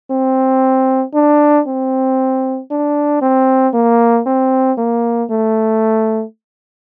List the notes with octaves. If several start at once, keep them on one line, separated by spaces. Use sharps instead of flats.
C4
D4
C4
D4
C4
A#3
C4
A#3
A3